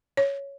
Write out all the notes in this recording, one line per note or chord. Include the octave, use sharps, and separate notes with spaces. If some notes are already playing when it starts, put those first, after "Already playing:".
C#5